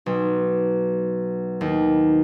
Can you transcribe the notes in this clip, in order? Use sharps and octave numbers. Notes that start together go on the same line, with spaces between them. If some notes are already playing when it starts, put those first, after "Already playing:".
B1
D#2